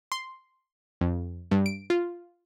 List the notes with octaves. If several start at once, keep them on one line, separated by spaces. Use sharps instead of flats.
C6
F2
G2
D7
F4